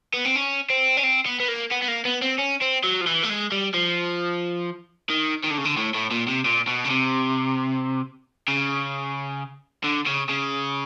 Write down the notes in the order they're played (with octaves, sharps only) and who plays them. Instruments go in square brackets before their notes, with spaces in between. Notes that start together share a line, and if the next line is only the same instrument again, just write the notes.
[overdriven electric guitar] B3
C4
C#4
C4
C#4
C4
B3
B3
A#3
B3
B3
A#3
B3
C4
C#4
C4
F#3
F3
E3
A3
G#3
G3
F3
D#3
D#3
D3
C#3
D3
A2
A2
A#2
C3
A#2
B2
C#3
C3
C#3
D3
C#3
C#3